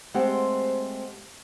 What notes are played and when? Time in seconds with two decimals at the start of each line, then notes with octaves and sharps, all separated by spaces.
0.14 G#3 A3 C4 G4 C5 F#5